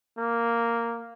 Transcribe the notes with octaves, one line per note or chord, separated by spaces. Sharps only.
A#3